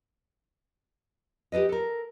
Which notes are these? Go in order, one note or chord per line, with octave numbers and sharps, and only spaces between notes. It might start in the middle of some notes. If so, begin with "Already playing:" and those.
G4 A4 B4 D#5
A4 A#4